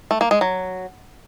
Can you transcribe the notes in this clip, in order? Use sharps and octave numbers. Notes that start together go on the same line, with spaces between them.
A3
A#3
G#3
F#3